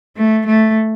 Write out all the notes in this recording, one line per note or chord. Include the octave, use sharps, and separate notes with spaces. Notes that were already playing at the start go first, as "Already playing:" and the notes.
A3
A3